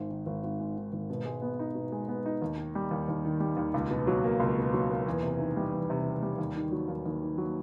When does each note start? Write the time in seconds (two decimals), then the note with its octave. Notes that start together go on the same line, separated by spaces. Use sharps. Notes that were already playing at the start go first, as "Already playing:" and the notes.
Already playing: G#1 G#2
0.10 D#3
0.26 G#1
0.43 G#1
0.60 G#2
0.77 D#3
0.93 G#1
1.10 B2
1.25 G#3
1.42 B3
1.59 D#4
1.75 B2
1.92 G#3
2.09 B3
2.26 D#4
2.42 D#2
2.58 D#3
2.75 G3
2.91 D#2
3.08 D#2
3.25 D#3
3.40 G3
3.57 D#2
3.74 C#2
3.90 B2
4.07 F#3
4.24 A#3
4.40 C#2
4.57 B2
4.73 F#3
4.89 A#3
5.07 E2
5.23 C3
5.39 D#3
5.56 G3
5.73 E2
5.90 C3
6.05 D#3
6.22 G3
6.38 D#2
6.56 D#3
6.72 F#3
6.88 D#2
7.06 D#2
7.22 D#3
7.38 F#3